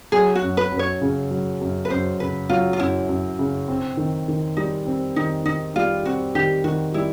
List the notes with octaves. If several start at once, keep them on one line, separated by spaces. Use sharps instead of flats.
F#3 G#4
F#4
F#2
B4
F#2
C#5
C#3
F#3
F#2
B4
F#2 C5
C#3 B4
F#3 F4
F4
F#2 E4
F#2
C#3
C4
D#3
D#3
G3 D#4
C4
D#3 D#4
D#3 D#4
G3 F4
C4 F#4
D#3 G4
D#3 F#4
G3 E4